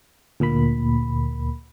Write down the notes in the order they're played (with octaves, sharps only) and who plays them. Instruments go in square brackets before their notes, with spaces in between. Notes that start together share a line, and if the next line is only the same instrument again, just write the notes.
[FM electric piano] D2 A#2 A#3 B5